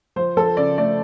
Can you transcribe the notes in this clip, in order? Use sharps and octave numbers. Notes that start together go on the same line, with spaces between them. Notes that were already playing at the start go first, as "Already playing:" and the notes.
F3 C5
F3 A4
C#3 D5
A3 D5